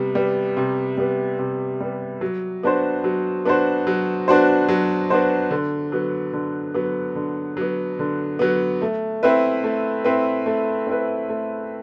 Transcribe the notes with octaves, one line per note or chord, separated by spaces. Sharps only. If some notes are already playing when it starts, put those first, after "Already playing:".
Already playing: C3 G3 B3
G3 B3
C3
G3 B3
C3
G3 B3
F#3
B3 D4 F#4 C5
F#3
B3 D4 F#4 C5
F#3
B3 D4 F#4 C5
F#3
B3 D4 F#4 C5
D3
F#3 B3
D3
F#3 B3
D3
F#3 B3
D3
F#3 B3
A3
C4 E4 B4
A3
C4 E4 B4
A3
C4 E4 B4
A3